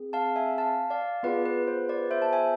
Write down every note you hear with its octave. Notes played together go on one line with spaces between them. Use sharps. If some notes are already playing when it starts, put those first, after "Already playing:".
Already playing: C4 G#4
F5 A5
E5 G#5
F5 A5
D5 F5
B3 F4 G#4 B4 D5
B4
C5
B4 D5
C5 E5
A5
E5 G#5